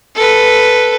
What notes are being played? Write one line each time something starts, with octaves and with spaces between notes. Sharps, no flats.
A4 B4